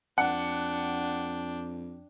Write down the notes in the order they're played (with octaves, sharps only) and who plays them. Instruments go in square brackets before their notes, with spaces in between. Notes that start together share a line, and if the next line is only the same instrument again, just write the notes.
[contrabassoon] F2 [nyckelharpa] D4 G5 [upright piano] F#5